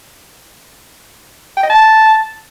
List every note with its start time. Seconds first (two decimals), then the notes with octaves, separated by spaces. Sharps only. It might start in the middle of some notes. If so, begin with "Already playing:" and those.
1.57 G5
1.63 D#5
1.70 A5